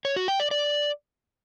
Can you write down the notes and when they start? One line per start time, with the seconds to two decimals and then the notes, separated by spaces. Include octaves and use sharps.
0.05 C#5
0.16 F#4
0.28 G5
0.40 D5
0.51 D5